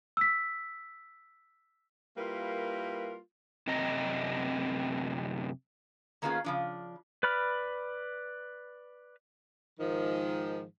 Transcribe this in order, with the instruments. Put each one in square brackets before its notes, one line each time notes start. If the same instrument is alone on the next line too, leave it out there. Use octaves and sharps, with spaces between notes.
[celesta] E6 B6
[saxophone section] G3 A#3 E4 F4 A#4 B4
[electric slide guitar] F#2 C3 C4 D#5 A#5
[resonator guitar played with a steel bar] D#3 A#3 B3 C#4 F4 G#4
C#3 F3 D4
[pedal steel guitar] B4 D5 B5 F6
[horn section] G#2 D#3 F3